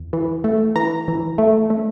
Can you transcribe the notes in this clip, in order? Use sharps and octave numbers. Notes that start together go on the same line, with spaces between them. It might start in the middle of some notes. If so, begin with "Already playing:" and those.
Already playing: E2
E3
A3
E3 A#5
E3
A3
A3